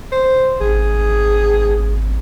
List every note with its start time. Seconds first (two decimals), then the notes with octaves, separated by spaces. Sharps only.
0.12 C5
0.61 G#1 G#4